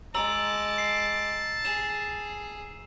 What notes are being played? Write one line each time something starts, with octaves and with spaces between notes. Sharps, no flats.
G#3 A5 A#5 D6 E6 F#7
C7
G#4 E7